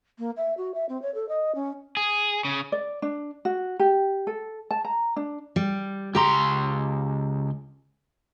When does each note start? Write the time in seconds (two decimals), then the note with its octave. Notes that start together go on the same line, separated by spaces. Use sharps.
0.19 A#3
0.37 E5
0.58 F#4
0.74 E5
0.89 C4
1.02 C#5
1.15 A4
1.29 D#5
1.55 C#4
1.97 G#4
2.45 C#3
2.72 D5
3.02 D4
3.45 F#4
3.79 G4
4.27 A4
4.71 A5
4.85 A#5
5.16 D4
5.56 G3
6.15 C#2 G4 A#5 C6